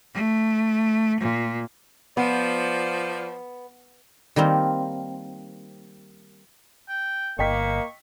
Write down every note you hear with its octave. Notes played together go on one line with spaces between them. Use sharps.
A3
A#2
F3 B3 D5
D#3 G3 A#3 C4
G5
G1 A#3 D#5 G5 C#6 B6